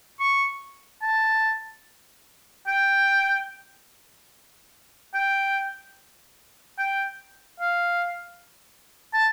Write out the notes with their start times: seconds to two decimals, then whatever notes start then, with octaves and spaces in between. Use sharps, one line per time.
0.20 C#6
1.02 A5
2.67 G5
5.14 G5
6.78 G5
7.60 F5
9.14 A5